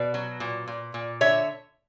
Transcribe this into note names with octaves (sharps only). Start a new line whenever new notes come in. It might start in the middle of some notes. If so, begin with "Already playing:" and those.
Already playing: B2 B4 D5
F#3
A#2
A#2
A#2
D3 C#5 E5